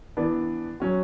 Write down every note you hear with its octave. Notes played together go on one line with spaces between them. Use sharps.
E3 B3 D4
F#3 C#4 F#4